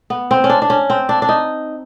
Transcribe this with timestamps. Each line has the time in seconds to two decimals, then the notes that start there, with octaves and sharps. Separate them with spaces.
0.10 B3
0.31 C4
0.44 C#4
0.49 D4
0.62 D4
0.70 C#4
0.90 C4
1.09 D4
1.22 D4
1.29 D#4